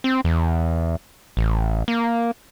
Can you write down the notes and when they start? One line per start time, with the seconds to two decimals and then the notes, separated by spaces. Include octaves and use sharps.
0.04 C4
0.25 E2
1.37 A1
1.88 A#3